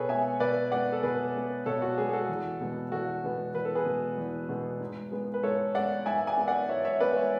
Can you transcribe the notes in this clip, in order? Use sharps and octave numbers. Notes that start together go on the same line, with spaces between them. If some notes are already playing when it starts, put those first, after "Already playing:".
Already playing: B2 G#4 A4 B4 C#5
G#3 B3 E5 G#5
B2 B4 D5
G#3 B3 D5 F#5
A4
B2 G#4 B4
G#3 B3
B2 A4 C#5
F#4
G#3 B3 G#4
G#4
F#4 A4
E2
B2 G#3 B3
E2 F#4 A4
B2 G#3 B3
E2 B4
A4
G#4 B4
B2 G#3 B3
E2
B2 G#3 B3
G#2
G#3 B3
B4
G#2 A4 C#5
G#3 B3 D5 F#5
G#2 E5 G#5
E5 G#5
G#3 B3
D5 F#5
G#2 C#5 E5
C#5 E5
G#3 B3 B4 D5
C#5 E5